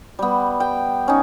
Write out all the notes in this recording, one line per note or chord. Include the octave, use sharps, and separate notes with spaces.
G3 B3
G5
C#4 D#4